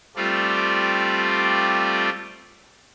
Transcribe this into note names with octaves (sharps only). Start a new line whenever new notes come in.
G3 A3 C4 F4 D5